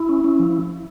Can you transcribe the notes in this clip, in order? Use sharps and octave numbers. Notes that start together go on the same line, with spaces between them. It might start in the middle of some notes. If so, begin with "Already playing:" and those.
Already playing: E4
C#4
C#4
F3